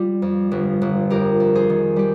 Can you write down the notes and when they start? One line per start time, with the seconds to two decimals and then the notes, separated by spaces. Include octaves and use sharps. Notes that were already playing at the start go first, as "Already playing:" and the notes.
Already playing: G3 F4
0.22 F2
0.51 G1
0.82 G1
1.10 F2 G4 A#4
1.40 F2
1.55 G#4 C5
1.70 D#3
1.96 G3 G4